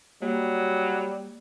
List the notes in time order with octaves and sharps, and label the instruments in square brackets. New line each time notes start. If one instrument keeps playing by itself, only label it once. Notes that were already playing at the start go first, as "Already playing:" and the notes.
[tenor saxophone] F#3 [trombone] G3 [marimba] A#3